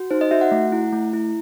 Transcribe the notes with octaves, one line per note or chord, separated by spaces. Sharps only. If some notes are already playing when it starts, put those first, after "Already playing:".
Already playing: F#4
D#4 C5
D#5
F#4 E5
F#5
A3
E4
A3
E4